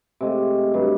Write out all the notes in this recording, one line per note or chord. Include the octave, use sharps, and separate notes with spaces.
C3 G#3 A3
G2 F#3